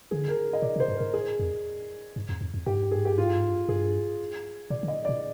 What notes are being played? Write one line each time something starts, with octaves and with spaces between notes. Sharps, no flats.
D3 G#4
A#4
D#5
A#2 D5
C3
C5
G2
G#2 A#4
G#4
F2
G2
F2
F2
F2
G2 G4
G#2
G2 G#4
G#2
G2 G4
G#2 F4
G2
G#2
G2
G2 G#4
A#2 D5
D3
D#5
A#2 D5